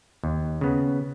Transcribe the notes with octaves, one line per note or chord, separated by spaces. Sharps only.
D#2
C#3 B3